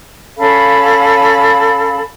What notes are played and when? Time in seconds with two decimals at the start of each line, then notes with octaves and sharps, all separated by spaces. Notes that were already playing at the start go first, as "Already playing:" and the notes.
0.38 C#4 A4 F5 B5